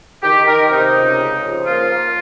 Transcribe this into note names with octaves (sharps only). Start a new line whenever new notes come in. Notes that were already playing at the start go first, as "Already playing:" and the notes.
D#3 G4
D#3 A#4
C3 D#4
C#2
C#3
F3
A#3 F4
A#3